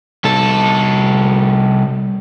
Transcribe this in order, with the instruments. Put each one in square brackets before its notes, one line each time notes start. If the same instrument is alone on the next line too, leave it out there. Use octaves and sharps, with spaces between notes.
[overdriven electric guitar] C2 A4